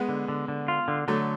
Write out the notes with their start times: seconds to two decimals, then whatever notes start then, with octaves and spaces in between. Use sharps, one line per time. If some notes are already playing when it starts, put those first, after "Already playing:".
Already playing: G#3 B3
0.09 D3
0.28 D3
0.48 D3
0.68 F4
0.88 D3
1.08 D3 F#3 A3